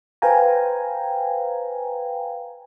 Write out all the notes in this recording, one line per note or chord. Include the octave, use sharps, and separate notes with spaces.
B4 C5 F5 G5 G#5 A#5